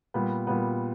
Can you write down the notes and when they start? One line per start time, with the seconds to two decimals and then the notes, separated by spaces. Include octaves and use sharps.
0.14 A#2 G3 B3
0.47 A#2 G3 B3